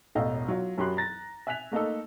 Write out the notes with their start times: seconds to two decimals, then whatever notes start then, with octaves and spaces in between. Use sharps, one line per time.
0.15 E1 A1 A4 D#5 F5
0.48 F#3 F4
0.77 F#2 F#3 G4 B5 C6 F#6
0.97 A#5 A6 A#6
1.47 E5 G#5 F#6 B6 F7
1.72 A3 A#3 D#4 A4